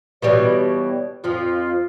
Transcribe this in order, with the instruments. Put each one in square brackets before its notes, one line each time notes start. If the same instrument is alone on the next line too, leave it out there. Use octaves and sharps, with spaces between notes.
[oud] B2 E3 G3 [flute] C#5
[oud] F2 F3 [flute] F4